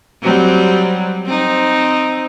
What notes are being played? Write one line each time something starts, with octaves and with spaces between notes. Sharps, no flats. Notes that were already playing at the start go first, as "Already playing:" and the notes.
F#3 G3 C4
C4 D#4